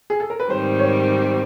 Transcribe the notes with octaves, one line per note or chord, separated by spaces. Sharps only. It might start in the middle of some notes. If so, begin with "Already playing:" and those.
G#4
A4
A#4
B4
G#2 D#3 G3 C4 C5
C#5